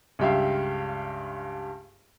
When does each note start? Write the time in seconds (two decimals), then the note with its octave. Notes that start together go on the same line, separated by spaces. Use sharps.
0.19 C#2 G2 G4 E5 F5